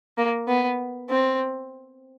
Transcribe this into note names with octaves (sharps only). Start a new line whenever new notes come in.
A#3
B3
C4